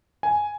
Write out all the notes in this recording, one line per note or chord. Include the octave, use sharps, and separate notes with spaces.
G#5